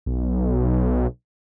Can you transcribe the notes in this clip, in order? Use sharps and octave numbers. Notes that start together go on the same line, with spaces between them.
B1